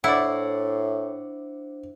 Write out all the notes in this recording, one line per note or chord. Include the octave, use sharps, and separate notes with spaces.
A2 D4 E4 C5 D5 F#5